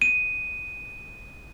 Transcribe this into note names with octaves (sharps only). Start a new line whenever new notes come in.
D#7